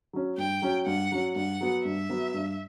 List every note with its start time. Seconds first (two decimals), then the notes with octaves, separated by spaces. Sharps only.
0.13 F#3 C#4
0.38 G2 G5
0.62 F#3 C#4
0.86 G2 F#5
1.12 F#3 C#4
1.36 G2 F#5
1.61 F#3 B3
1.85 G2 E5
2.10 F#3 B3
2.34 G2